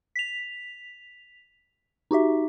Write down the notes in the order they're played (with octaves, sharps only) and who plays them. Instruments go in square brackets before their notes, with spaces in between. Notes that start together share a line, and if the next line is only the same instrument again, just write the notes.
[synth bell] B6 F7
D#4 F#4 G4 E5